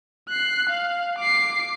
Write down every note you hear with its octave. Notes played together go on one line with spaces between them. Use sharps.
F#6 C7
F5
D6 C7